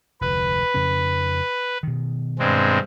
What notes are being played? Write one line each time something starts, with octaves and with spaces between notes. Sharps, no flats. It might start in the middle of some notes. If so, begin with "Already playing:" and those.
F1 D2 B4
F2 C#3 C#4
B2 D#3
G2 G#3 C4